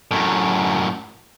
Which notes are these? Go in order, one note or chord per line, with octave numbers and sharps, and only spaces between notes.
F#2 A2